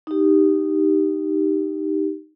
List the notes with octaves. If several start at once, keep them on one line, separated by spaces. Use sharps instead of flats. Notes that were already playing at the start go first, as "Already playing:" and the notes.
D#4 G4